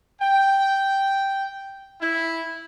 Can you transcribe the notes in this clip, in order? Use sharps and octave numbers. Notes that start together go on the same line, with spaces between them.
G5
E4